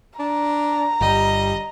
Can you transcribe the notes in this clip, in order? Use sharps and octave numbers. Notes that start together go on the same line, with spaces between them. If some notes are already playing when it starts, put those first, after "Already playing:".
D4 A#5
G1 G3 D#5